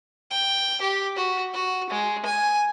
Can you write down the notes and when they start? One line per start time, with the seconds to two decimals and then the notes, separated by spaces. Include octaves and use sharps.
0.31 G5
0.81 G4
1.16 F#4
1.53 F#4
1.90 G#3
2.25 G#5